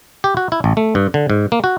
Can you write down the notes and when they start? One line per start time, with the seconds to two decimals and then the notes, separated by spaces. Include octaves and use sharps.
0.24 G4
0.37 F#4
0.52 E4
0.64 A1
0.77 A3
0.95 G2
1.14 D3
1.30 G#2
1.52 A#3
1.64 F#4